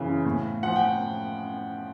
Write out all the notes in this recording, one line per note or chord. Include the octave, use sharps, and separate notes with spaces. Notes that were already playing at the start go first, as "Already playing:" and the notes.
Already playing: F#2 C#3 E3
A2
F3 F#5
G5